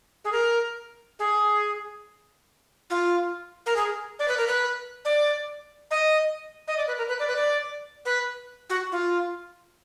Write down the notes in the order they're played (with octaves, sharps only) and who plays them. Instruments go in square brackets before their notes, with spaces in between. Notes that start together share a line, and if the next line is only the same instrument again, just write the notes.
[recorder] G#4
A#4
G#4
F4
A#4
G#4
D5
B4
A#4
B4
D5
D#5
D#5
D5
B4
A#4
B4
D5
B4
D5
B4
F#4
F4